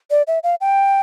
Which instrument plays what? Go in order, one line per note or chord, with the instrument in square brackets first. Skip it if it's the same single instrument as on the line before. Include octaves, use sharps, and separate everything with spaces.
[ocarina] D5
E5
F5
G5